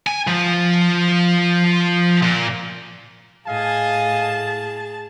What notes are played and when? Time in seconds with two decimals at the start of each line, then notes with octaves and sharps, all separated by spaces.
0.07 G#5
0.27 F3
2.22 A#2
3.46 A2 G#4 D#5 F5 G#5 A5